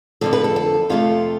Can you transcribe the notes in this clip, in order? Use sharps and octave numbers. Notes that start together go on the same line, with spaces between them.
F2 D3 F3 A4
B4
A4
A4
F2 C3 F3 A3 F4